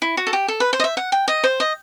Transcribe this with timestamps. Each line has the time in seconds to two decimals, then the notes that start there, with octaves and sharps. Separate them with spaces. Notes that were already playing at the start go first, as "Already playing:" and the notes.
0.02 E4
0.17 F#4
0.27 A4
0.33 G4
0.48 A4
0.60 B4
0.73 C5
0.80 D#5
0.84 E5
0.97 F#5
1.12 G5
1.28 D#5
1.44 C5
1.60 D#5